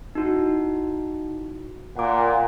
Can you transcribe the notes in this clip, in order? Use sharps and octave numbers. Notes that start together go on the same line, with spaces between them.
D#4 E4 F#4
A#2 F#5 D6